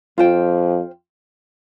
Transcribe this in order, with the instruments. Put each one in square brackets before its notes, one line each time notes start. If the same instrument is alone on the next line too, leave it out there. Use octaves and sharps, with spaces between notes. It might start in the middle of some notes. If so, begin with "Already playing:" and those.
[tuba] F2 [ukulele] F4 C5 G5